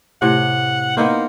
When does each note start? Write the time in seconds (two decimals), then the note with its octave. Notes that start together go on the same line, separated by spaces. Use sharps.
0.22 A2 C3 F#5
0.97 A#3 B3 D#4 C5